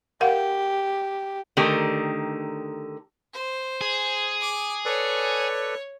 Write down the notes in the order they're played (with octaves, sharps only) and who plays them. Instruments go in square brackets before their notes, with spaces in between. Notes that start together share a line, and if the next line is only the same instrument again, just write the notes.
[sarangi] G4 [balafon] A#4 F5 F#5
[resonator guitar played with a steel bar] D3 D#3 A3 G4 A#4
[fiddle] C5
[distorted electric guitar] G#4
[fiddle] D6
[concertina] A4 B4 D5 [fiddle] C#5